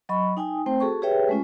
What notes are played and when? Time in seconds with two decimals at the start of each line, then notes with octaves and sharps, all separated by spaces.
0.09 F#3 D#5 B5 C#6
0.37 D#4 G5 G#5 D#6
0.66 A3 C4 C5 G5
0.80 F#4 G#4 A4 A5 C#6
1.02 G4 G#4 B4 C#5 E5 G5
1.29 G#3 A3 C#4 F4